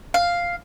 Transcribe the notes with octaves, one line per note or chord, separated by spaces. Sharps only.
F5